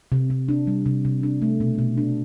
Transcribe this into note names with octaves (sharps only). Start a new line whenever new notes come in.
C3
C3
D4
G3
C3
C3
D4
A3
B2
B2
D4